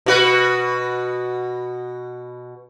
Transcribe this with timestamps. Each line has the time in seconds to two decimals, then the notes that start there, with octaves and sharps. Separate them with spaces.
0.06 B2 F#4 B4